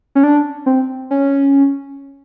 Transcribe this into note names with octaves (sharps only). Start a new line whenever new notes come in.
C#4
D4
C4
C#4